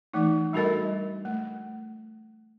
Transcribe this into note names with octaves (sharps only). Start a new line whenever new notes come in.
E3 A3 D#4
G3 D4 F#4 A4 A#4 D#5
A3